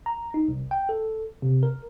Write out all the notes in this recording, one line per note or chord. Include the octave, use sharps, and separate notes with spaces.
A#5
D#4
C2
G5
A4
C3
A#4